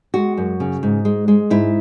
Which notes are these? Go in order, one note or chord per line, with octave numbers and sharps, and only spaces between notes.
G#3 F#4
F#2
C#3
G#2
G#3
G#3
G#2 E4